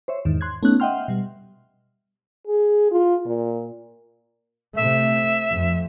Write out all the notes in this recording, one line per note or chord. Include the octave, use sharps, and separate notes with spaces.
C5 C#5 E5
E2 G#2 D#3
C6 F#6 G#6
A3 B3 C#4 D#4 F#6
D#5 E5 F#5 G5 C6 F6
B2 G3
G#4
F4
A#2
C3 A3 E5
F2